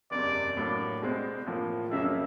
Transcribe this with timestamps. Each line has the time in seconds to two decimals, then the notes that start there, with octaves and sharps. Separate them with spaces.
0.11 F#1 E2 C3 D5
0.57 A2 F#3 A#3 D4
1.02 C2 B2 G#3 C4
1.47 A2 F3 A#3
1.91 F2 C#3 F#3 A#3 E5